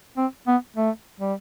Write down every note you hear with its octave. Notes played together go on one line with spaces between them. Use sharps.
C4
B3
A3
G3